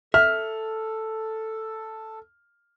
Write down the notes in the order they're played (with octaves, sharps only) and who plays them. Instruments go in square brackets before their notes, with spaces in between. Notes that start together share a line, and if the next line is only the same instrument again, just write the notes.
[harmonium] A4 [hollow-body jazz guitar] E5 [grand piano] F6